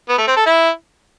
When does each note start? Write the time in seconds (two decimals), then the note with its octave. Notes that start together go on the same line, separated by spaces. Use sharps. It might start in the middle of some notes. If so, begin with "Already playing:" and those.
0.09 B3
0.18 A3
0.27 C4
0.37 A4
0.46 E4